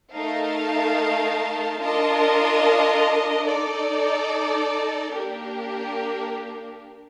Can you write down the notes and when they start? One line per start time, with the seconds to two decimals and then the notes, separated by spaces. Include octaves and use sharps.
0.13 A3 D#4 A#4 F5 A5
1.80 D4 F4 A#4 D#5 A5
3.47 D#4 A4 D5
5.13 A#3 D4 G4 A#4